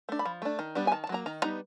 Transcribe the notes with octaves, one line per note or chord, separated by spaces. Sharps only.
A3 D4
B5
F3
A3 D4
D#3
G3 B3 D4
G#5
D#3 A5
A5
F#3 A#3 A#5
D#3 A#5
G3 B3 D#4 A#5